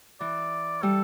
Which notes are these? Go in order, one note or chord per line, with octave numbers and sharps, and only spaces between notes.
E3 D5
G3 A4